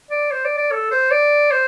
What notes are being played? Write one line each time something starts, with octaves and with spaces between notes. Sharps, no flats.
D5
C5
D5
D5
A4
C5
D5
C5